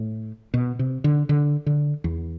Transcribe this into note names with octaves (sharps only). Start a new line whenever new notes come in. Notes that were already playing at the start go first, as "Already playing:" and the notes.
Already playing: A2
B2
C3
D3
D3
D3
E2